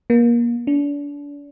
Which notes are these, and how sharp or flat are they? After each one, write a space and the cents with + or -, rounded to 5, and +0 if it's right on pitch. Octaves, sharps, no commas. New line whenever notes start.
A#3 +25
D4 -35